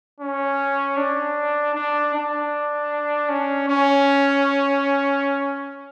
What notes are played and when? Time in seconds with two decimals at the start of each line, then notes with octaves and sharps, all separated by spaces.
0.20 C#4
0.97 D4
1.75 D4
2.14 D4
3.30 C#4
3.69 C#4